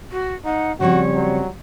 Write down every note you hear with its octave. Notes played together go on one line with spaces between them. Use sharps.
F#4
D#4 F#5
C#3 F3 G3 C4 F#4 C#5
F#3